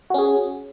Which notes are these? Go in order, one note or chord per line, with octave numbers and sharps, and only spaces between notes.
C#4 F#4 G#4